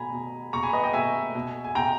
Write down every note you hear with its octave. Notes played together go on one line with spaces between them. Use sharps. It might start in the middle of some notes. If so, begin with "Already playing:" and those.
Already playing: B2 G#5 A#5 B5
B2
B2 A#5 C#6
G#5 B5
B4 D#5
D#5 G5
B2 E5 G#5
B2
G#5
B2 G5 A#5